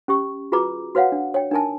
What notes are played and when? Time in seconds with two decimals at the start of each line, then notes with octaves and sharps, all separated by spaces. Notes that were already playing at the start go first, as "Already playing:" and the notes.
0.08 C#4 G4 C#6
0.52 F4 F#4 G#4 B4 A#5 D6
0.95 F#4 B4 C#5 F5 F#5
1.12 D4
1.34 C#5 G5
1.51 D4 D#4 A#4 G#5 A5